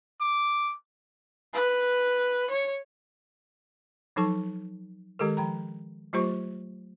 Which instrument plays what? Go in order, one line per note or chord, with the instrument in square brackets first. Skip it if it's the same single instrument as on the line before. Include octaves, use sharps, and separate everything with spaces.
[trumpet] D6
[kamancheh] B4
C#5
[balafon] F3 F#3 D#4 A4 A5 C#6
D#3 G#3 G4 A4 A#4
F3 G5 A#5
F#3 A3 F4 G4 C5 C#6